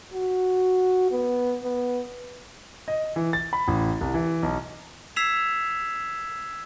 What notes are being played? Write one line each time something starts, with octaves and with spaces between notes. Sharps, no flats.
F#4
B3
B3
D#5
E3
A6
B5
A1
C2
E3
B1
E6 G#6 B6 C7 E7 F7